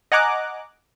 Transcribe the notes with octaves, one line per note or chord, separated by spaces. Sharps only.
D#5 F#5 G#5 A#5 D6 F#6